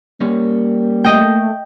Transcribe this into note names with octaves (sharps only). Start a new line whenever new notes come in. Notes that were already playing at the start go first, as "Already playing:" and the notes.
G3 A#3 C#4 C#5
A3 D#5 G5